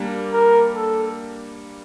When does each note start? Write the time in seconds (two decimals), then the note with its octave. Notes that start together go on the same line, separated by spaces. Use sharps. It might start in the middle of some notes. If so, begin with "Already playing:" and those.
Already playing: G3 A#3 D4
0.33 A#4
0.75 A4